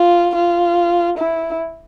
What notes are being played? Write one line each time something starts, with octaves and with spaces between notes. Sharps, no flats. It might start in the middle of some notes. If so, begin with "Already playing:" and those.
Already playing: F4
F4
E4